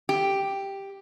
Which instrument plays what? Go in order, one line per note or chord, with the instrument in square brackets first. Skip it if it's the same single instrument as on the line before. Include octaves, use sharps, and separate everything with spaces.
[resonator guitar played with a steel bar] G4